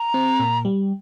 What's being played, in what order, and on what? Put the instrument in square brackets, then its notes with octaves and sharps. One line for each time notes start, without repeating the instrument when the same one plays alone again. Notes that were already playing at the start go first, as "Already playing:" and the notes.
Already playing: [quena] A#5
[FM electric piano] C4
A#2
G3